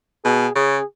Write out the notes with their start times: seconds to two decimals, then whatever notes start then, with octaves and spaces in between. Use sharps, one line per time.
0.24 B2 G#4
0.55 C#3 G#4